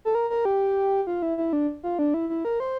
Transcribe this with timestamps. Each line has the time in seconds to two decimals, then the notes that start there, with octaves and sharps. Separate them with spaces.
0.05 A4
0.15 A#4
0.30 A#4
0.45 G4
1.07 F4
1.22 E4
1.38 E4
1.53 D4
1.83 F4
1.99 D4
2.14 E4
2.29 E4
2.45 A#4
2.60 C5